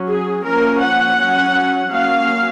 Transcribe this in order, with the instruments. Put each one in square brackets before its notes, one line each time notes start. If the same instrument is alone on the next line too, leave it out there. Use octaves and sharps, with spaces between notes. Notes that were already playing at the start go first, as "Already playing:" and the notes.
Already playing: [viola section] F#3 C#4
G#4
F3 A#3 C#4 A#4
F#5
F#3 C#4
F#3 A#3 C#4 F5